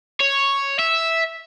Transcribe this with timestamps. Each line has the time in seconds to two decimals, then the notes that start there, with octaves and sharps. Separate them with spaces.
0.20 C#5
0.79 E5